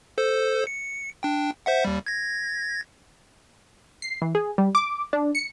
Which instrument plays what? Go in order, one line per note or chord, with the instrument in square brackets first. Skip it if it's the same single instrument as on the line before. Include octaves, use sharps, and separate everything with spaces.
[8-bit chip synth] A4 C5
C#7
D4 G5
C5 E5 F#5
D#2 G3
G#6 A#6
[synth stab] C7
E3
G#4
G3
D6
D4
C#7